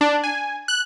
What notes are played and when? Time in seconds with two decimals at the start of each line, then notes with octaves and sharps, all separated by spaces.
0.01 D4
0.24 G#5
0.68 F#6